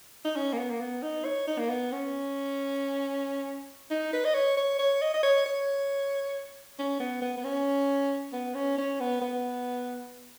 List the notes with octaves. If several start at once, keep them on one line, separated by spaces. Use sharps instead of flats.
D#4
C#4
A#3
B3
A#3
B3
D#4
C#5
D#4
A#3
B3
C#4
D#4
B4
D#5
C#5
C#5
C#5
D#5
D#5
C#5
C#5
C#4
B3
B3
B3
C#4
B3
C#4
C#4
B3
B3